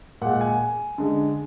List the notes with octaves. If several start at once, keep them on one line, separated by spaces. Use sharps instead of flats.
A#2 G#3 F#5
G#5
D3 G#3